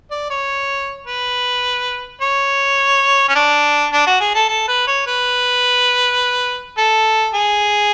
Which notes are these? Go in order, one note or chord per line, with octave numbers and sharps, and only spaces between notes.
D5
C#5
B4
C#5
C#4
D4
D4
F#4
G#4
A4
A4
B4
C#5
B4
A4
G#4